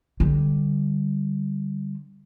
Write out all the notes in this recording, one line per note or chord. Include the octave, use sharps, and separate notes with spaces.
D3 G3